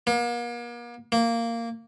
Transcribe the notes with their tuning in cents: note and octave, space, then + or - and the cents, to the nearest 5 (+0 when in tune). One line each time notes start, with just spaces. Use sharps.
A#3 +40
A#3 -10